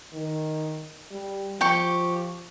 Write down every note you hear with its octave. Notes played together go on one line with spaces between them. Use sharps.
D#3
G3
F3 G4 G5 C#6